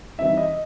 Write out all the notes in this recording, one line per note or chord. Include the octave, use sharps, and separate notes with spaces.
E3 G3 C4 D#4 E5
D#5